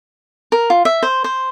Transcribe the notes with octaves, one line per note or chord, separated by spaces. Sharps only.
A#4
F4
E5
C5
C5